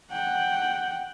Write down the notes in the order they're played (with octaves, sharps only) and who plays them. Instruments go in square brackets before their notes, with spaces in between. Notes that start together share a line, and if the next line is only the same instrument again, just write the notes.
[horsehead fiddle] F#5 G5